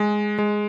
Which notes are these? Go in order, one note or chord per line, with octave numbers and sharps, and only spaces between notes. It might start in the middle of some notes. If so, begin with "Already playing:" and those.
Already playing: G#3
G#3